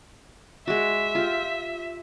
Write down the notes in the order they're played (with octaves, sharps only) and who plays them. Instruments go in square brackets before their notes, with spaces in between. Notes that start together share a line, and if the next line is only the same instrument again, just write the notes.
[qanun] G#3 F#4 [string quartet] E5
[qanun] F4 G4